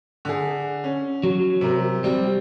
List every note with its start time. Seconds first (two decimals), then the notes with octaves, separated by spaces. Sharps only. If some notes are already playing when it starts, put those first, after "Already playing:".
0.25 D3 G#4
0.84 C#4
1.23 F#3
1.61 C3 A#4
2.04 G3 C4